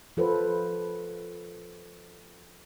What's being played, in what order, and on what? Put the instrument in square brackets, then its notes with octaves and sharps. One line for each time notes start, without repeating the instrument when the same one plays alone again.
[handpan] F3 F4 A4 B4 C5